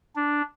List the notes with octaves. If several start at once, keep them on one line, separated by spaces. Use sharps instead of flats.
D4